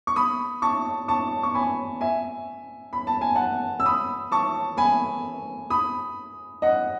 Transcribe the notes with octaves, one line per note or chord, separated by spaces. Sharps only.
C#6
B5 D#6
A5 C#6
A5 C#6
C#6
G#5 B5
E5 G#5
B5
A5
G#5
F#5 A5
E6
B5 D#6
A5 C#6
G#5 B5
B5 D#6
D#5 F#5